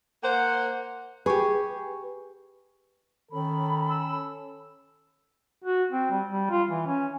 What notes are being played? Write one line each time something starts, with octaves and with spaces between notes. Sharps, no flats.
A#3 C5 F#5
G4 G#4 B4 C#6
D#3 C#4 A4 B5
E6
F#4
C4
G3
G3
F4
E3
C#4